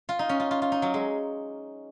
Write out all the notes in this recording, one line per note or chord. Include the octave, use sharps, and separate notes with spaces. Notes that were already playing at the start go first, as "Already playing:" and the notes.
F4
D#4
C#4
F4
F4
F4
D#4
F#3
G#3